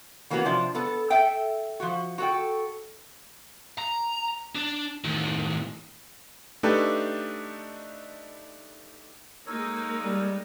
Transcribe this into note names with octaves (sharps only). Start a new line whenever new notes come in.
E3 A#3 B3 C#4 F#4
C3 F3 D4
B3 A4
A4 E5 G5
F3 F#4
F#4 A4 G5
A#5
D4
A2 D#3
A3 D4 D#4 G4 A4 B4
G#3 A#3 D#4 A4 A#4 C#5
G3